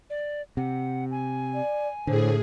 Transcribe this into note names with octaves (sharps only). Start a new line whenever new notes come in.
D5
C3 F#5
G#5
D5
A2 D3 G#4 C5